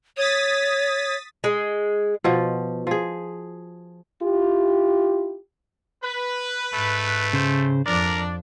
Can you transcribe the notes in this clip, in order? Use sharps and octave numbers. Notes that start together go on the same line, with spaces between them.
C#5 D#6 A6 B6
G#3
B2 F3
F3 G#4
E4 F4 G4
B4
G#2 A3
C#3 C5
F2 F3 D4 A#4 D5